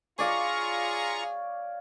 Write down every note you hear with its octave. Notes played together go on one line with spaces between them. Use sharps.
F4 G#4 C#5 D5 F5 A#5 C#6